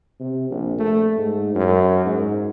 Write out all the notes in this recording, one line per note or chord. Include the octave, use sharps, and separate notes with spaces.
C3
A#1
A3
G#2
F#2
G#2